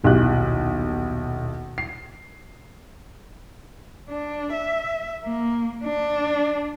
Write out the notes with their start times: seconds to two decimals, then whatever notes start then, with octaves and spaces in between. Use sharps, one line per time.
0.04 D#1 B1 E4 G4 F#6
1.78 C7
4.09 D4
4.53 E5
5.24 A#3
5.84 D4